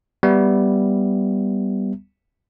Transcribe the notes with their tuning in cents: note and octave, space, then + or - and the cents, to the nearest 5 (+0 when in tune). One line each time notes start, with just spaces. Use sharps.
G3 +0 B3 +0 E5 +0